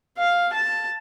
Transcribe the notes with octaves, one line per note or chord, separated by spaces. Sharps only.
F5
A5